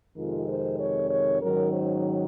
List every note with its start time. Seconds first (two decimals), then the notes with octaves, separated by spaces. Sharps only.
0.17 F2 C3 D#3 G#3 F4
0.48 C5
0.80 C#5
1.10 C#5
1.41 G#2 D#3 F#3 C#4 A#4
1.72 C5